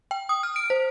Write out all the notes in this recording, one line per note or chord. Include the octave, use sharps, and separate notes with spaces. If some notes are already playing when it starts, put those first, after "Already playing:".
G5
D#6
F6
D7
C5